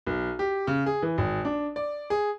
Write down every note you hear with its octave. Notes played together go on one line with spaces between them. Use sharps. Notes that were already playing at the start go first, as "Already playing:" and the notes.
B1
G4
C#3
G#4
E3
G#1
D4
D5
G#4